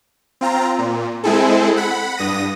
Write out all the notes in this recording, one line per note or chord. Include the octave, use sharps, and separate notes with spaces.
C4 F4 A#5
A#2
G#3 C4 E4 G#4 A4
F#5 B5
G2 D#6 A#6